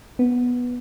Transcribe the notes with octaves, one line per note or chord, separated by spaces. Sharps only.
B3